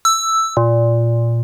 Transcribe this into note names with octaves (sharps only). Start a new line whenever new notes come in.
E6
A#2